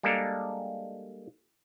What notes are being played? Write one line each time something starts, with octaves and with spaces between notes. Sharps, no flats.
G3 G#3 A#3 D4 A4 A#4